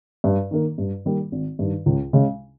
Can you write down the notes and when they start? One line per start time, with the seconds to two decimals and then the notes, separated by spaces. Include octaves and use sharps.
0.24 G2
0.51 D#3 A#3
0.78 G2
1.05 D#3 G3 A#3
1.32 G#1
1.59 G2 D#3
1.86 C#2
2.13 C#3 G#3